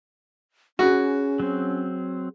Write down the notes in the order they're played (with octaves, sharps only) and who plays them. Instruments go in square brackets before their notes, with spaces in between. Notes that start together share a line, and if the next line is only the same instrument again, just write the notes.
[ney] C#4 [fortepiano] F#4 [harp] G#4 B4
[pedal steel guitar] F#3 C4